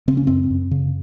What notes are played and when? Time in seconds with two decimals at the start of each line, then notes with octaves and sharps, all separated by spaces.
0.08 C#3 C4
0.17 C#4
0.27 F#2 C4
0.50 F#2
0.71 C#3